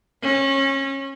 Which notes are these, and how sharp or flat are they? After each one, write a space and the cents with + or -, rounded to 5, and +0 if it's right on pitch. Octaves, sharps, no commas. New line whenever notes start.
C#4 -25